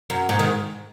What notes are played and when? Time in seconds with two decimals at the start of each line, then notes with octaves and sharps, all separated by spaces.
0.10 F#2
0.29 G#2
0.39 D#3